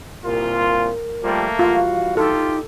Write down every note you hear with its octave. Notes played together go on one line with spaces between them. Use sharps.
C2 A#2 F4 A#4
F3 G3 A3 A#3
E3 G3 F4 F#4 F5
D#4 F4 G4 A4